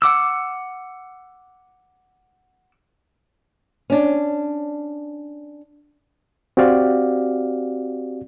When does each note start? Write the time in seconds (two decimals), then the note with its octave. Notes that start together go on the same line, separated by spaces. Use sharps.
0.02 F#5 D6 E6
3.90 C#4 D4
6.57 C4 F#4 G4 D5 F5